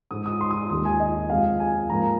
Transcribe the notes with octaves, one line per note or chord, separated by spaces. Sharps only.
G#2 G#3 D#6
D#6
C6
D#6
D#2 D#3 G#3 D#6
G#5
D#5
F2 C3 G#3 F5
G#5
G#2 F3 A#3 A#5